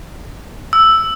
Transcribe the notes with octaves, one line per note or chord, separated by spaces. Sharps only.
E6